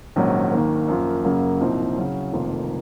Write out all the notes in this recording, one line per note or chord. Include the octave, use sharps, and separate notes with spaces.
A#1 G#2 D#3 F#3 C#4
D#2 D#3 A#3
F#2 F3 A#3 F4
F#2 C#3 F#3 A#3
C2 A#2 F3 C4 D#4
C#3 F#3 C#4
F1 F2 D#3 A#3 F4